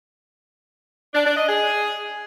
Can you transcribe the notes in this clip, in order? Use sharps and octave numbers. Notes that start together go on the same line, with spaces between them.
D4
D4
D#5
G#4